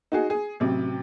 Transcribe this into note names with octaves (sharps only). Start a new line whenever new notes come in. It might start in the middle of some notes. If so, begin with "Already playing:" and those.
D#4 F#4 G#4
G#4
A1 C3 F#3